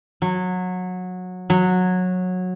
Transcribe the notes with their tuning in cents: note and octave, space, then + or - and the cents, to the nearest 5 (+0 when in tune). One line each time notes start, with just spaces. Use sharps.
F#3 -20
F#3 -15